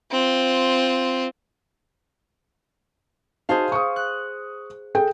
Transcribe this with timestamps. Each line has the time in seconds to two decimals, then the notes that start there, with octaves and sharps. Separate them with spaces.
0.11 C4 F4
3.49 D#4 F#4 G#4 C5 F5 A5
3.72 C#6 D#6
3.96 F#6
4.95 G#4 A4 G5